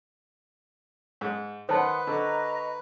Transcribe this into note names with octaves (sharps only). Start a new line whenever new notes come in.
G#2
D#3 B4 C5 F#5 A5 C6 D#6
D3 D#5 A#5 C#6